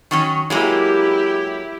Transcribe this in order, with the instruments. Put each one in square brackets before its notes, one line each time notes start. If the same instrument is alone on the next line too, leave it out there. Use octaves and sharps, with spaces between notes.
[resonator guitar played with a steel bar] D#3 F#3 C#4
[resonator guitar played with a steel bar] F#3 G#3 A#3 [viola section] E4 G4